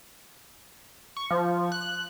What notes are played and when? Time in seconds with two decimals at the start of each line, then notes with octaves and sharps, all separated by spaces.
1.17 C#6
1.31 F3
1.72 F#6